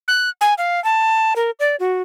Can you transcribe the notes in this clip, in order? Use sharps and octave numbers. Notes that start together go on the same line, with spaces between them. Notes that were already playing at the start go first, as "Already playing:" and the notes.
F#6
G#5
F5
A5
A#4
D5
F#4